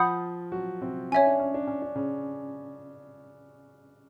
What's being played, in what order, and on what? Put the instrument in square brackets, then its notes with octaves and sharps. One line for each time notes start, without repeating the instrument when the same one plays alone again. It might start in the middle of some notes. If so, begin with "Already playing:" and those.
Already playing: [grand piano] F3 F4 [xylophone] F#5 B5 D#6 G6
[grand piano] F#3 F#4
C3 C4
[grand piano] C#4 [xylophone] C#5 E5 G#5
[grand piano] D4
C#4
D4
C#4
D4
C#3 C#4